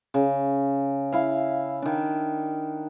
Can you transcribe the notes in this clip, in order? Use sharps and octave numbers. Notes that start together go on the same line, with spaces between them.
C#3
E4 F5
D#3 D4